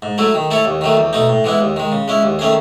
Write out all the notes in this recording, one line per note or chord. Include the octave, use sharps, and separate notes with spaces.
G#2
F#3 A3 E4
D#3
A3 E4 A4 C#5
D#2
D#3 F#3 A3
E2
B2 A3 D#4
A2
E3 G#3 B3 E4
D#2
D#3 G#3
C#3
G#3 C#4 E4
D#2
D#3 A3 C#4 G#4